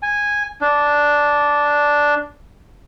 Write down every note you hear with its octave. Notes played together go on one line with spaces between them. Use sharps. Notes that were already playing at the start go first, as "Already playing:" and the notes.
G#5
D4